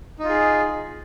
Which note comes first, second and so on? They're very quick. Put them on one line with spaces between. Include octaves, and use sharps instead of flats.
D#4 F4 G#4